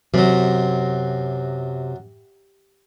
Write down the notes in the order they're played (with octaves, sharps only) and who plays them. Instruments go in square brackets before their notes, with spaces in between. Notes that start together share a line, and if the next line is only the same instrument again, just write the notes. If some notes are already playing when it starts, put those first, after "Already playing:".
[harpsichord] F#2 F#3 [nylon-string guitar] C3